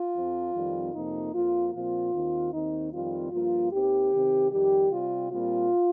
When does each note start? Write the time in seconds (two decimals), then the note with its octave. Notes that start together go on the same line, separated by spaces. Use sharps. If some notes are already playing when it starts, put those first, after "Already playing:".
Already playing: F4
0.14 F2 F3 C4
0.54 F2 D#3 G3 C4
0.93 F2 C3 F3 A#3 D#4
1.33 F2 F3 A#3 F4
1.73 A#2 F3 C4 F4
2.13 D#2 D#3 C4
2.52 D#2 D#3 C4 D#4
2.92 F2 D#3 G3 C4 F4
3.32 G2 F3 A#3 F4
3.71 D#2 D#3 C4 G4
4.11 C3 D#3 C4
4.51 F2 D#3 G3 G4
4.90 C3 G3 C4 F4
5.31 A#2 G3 C4 F4